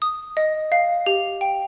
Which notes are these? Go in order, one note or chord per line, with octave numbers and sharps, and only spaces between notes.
D#6
D#5
F5
G4
G5